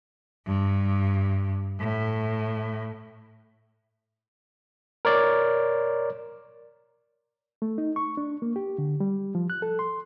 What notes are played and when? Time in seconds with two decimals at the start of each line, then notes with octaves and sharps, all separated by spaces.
0.47 G2
1.80 A2
5.05 A#4 C#5 D5
7.62 A3
7.78 D#4
7.96 C#6
8.17 D4
8.42 A#3
8.56 G4
8.78 D3
9.00 G3
9.35 F3
9.50 F#6
9.62 A4
9.79 C6